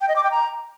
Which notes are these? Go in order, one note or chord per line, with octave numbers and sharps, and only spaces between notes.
G5
D#5
D6
G5
A#5